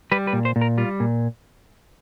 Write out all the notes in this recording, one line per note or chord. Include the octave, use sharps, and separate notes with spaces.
G3 B4
B4
A#2
C5
A#2
A#4
G3 F4
A#2